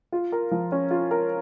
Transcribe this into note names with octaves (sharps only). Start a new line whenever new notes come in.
F4
A#4
F3
C#4
F4
A#4